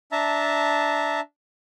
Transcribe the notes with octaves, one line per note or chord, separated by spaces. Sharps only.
D4 E5 A5 A#5